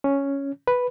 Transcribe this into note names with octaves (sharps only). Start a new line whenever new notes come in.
C#4
B4